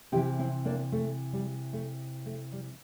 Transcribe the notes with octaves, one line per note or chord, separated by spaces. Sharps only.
C3 E3 E4 G4
C4 E4
A#3 D4
A3
G3
A3
A3
G3